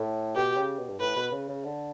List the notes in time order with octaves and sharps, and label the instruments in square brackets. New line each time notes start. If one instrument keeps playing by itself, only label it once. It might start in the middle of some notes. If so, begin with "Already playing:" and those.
Already playing: [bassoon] A2
[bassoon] B2 [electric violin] G4
[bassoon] C#3
B2
G2
[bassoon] A2 [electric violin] B4
[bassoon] B2
C#3
C#3
D3